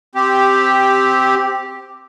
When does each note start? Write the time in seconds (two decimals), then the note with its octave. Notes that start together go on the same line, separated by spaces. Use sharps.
0.15 C4 G4